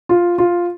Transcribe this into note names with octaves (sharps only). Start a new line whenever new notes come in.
F4
F4